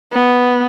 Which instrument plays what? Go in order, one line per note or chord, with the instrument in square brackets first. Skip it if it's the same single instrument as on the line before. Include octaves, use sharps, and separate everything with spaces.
[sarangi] B3